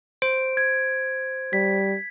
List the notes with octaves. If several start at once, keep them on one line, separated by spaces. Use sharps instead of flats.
C5 D7
G#6
G3 B6